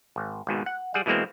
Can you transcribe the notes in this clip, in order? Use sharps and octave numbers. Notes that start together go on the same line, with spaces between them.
G#1
G#1 G#2 B2
F#5
G3 G#4 F#5
B2 E3 G#3 A#3 C4